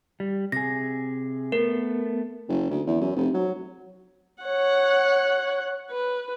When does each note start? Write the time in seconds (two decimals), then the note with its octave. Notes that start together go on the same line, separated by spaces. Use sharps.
0.20 G3
0.52 C3 G#4 A#6
1.52 A3 B3 A#4
2.49 F#1
2.70 D2
2.87 E2
3.00 F#2
3.16 F1
3.34 F#3
4.43 C#5 F#5
5.91 B4